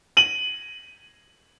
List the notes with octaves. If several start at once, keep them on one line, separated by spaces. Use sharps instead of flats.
D#7 F#7